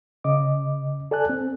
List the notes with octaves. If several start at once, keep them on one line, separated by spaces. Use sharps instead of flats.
C#3 D#5 D6
A4 D5 G#5 A5 F#6
C4